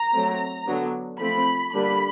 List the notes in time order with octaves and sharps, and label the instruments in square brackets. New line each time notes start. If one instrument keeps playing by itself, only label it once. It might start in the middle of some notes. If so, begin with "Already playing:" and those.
Already playing: [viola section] A#5
F#3 A3 C4
D3 F#3 B3 D4
F3 A3 C4 B5
D3 G3 A#3 D4 B5